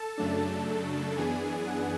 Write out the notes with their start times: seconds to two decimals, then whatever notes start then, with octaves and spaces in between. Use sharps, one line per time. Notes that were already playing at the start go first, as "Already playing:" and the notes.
Already playing: A4 A5
0.18 F#2 C#3 F#3 A3 D4
1.17 F#2 E3 B3 D4 G#4 G#5
1.67 F#5